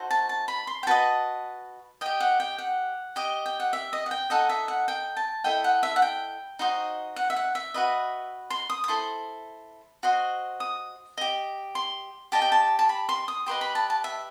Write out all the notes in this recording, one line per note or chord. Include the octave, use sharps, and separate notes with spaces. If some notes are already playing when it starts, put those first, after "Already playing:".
Already playing: D#4 F#4 A4 C5
A5
A5
B5
C6
G5
F#4 B4 D#5 A5
G4 D#5 G5
F#5
G5
F#5
G4 D#5
G5
F#5
E5
D#5
F#5
G5
D#4 A4 D#5 F#5
E5
F#5
G5
A5
E4 A4 D#5 G5
F#5
E5
F#5
G5
D#4 F#4 C5 D#5
F#5
E5
F#5
E5
F#4 B4 D#5
C6
D#6
D#6
E4 A4 C5 C6
F#4 C5 D#5
D#6
G4 D#5
C6
G4 D#5 A5
G5
A5
A5
B5
C6
D#6
G4 B4 D#5 C6
B5
A5
A5
E5